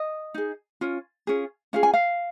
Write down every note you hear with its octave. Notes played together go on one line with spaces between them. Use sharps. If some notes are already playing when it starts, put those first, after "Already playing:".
Already playing: D#5
D#4 G#4
C#4 F4
C#4 F4 G#4
C#4 F4 G#4 F5
G#5
F5